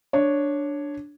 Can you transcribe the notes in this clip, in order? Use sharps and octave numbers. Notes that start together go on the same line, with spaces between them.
D4 C#5